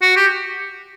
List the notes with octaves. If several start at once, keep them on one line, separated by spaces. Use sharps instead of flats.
F#4
G4